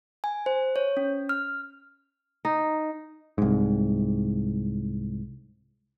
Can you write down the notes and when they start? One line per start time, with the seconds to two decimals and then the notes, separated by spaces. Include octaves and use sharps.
0.24 G#5
0.46 C5
0.76 C#5
0.97 C#4
1.29 F6
2.45 D#4
3.38 C2 G#2